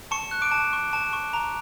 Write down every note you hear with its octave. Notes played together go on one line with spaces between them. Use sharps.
A5 C#6 C#7
F#6
D6 D7
A5
C#6
A5
C#6
A#5